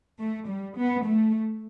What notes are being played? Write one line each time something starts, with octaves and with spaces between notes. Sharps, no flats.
A3
G3
B3
A3